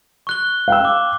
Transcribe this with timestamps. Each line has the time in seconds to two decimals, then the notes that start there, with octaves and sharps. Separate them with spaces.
0.27 C#6 F#6 G7
0.68 F5 G5 E6
0.85 D6